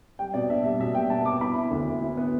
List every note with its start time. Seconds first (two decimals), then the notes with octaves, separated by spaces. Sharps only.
0.19 G3 G5
0.34 B2 D5
0.49 D4 E5
0.64 G3 E5
0.80 B2 E5
0.95 G3 G5
1.10 B3 A5
1.25 B3 D6
1.41 E4 B5
1.56 E4
1.71 D2
1.87 D2
2.02 E4
2.17 B3